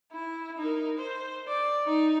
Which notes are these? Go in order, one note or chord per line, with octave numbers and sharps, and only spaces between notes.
E4
D#4 A#4
C5
D5
D#4